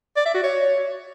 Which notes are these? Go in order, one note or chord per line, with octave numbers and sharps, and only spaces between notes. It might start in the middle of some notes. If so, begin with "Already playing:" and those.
D5
E5
F#4
C#5